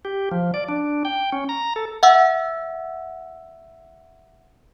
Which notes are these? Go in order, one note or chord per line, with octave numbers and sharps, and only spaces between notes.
G4
F3
D5
D4
G5
C#4
A#5
A4
E5 F#5 E6